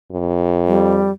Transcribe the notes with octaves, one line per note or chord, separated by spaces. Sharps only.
F2
G3